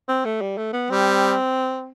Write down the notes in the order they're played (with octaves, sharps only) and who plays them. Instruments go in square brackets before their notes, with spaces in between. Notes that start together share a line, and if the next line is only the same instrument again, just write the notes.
[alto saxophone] C4
A3
G3
A3
B3
[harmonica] G3 [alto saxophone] C4